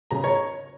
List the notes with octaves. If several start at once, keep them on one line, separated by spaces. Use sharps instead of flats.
C#3 A#5
C#5